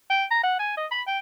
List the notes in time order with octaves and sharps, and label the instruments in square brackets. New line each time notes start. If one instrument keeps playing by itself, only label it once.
[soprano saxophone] G5
A#5
F#5
G#5
D#5
B5
G5